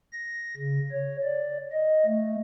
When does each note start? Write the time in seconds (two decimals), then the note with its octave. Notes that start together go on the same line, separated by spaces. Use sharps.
0.13 A#6
0.57 C#3
0.92 C#5
1.23 D5
1.72 D#5
2.06 A3